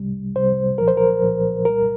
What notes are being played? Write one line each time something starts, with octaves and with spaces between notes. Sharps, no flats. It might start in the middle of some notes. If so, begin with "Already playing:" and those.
Already playing: C2 C3 G3
C2 C3 G3 C5
C2 A#2 F3 A#4
C5
A#4
C2 A#2 F3
C2 A#2 G3 A#4